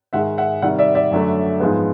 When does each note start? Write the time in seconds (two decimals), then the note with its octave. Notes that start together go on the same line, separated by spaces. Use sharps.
0.13 G#2 D#3 G#3 E5 F#5
0.38 E5 F#5
0.62 C3 D#3 G3 E5 F#5
0.78 D5 E5
0.95 D5 E5
1.11 F#2 D3 F#3 A3
1.60 G#2 F3 G#3 B3